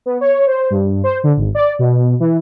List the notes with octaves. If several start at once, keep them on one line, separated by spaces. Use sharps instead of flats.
B3
C#5
C5
G2
C5
D3
G#1
D5
B2
E3